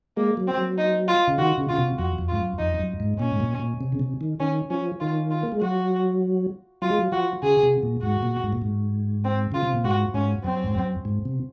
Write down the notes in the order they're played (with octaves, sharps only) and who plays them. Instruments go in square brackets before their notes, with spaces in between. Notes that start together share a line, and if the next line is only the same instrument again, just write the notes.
[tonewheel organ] G#3 [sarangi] A#3
[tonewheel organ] F#3
[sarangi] C4
[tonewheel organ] F#3
[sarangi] D#4
F4
[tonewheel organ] C#3
[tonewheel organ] D#3 [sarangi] F#4
[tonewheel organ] C#3
[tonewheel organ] C#3 [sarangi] F4
[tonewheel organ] C3
[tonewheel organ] F2 [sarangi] F#4
[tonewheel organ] F2
[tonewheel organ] G#2 [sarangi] F4
[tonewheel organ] F#2
[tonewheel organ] F2 [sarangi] D#4
[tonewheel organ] F#2
G#2
[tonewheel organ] A#2 [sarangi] C#4
[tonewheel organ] G#2
A#2
A#2
C3
C#3
C3
D#3
[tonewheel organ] D#3 [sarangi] C#4
[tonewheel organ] F3 [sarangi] C#4
[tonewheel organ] D#3 [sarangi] F4
[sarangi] F4
[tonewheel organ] A#3
G#3
[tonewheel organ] F#3 [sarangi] F#4
[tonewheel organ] F#3 [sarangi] F4
[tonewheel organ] G#3
F#3
[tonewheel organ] F3 [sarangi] F#4
[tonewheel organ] C#3 [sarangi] G#4
[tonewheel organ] C3
A#2
[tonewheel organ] G#2 [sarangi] F#4
[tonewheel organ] A#2
G#2
A#2
G#2
[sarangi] C4
[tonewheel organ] C#3 [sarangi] F4
[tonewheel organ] C3
A#2
[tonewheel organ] G#2 [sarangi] F#4
[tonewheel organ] G#2 [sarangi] C#4
[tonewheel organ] F#2 [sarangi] C4
[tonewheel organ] G#2
F#2
G#2
C3